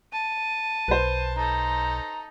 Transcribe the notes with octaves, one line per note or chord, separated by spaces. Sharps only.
A5 D#7
B1 B4 C5
D#4 A4 A#5